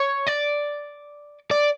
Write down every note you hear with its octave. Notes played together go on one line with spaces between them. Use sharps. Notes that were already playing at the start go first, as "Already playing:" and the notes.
Already playing: C#5
D5
D5